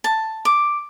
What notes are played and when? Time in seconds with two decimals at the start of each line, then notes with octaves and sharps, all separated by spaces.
0.04 A5
0.45 D6